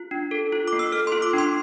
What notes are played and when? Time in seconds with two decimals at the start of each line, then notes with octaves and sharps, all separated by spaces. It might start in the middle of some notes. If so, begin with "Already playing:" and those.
Already playing: F4
0.11 D4
0.31 A4
0.52 F4
0.68 D6
0.73 A#3
0.79 E6
0.92 A4 F6
1.07 F4 C6
1.22 D6
1.33 D4 C6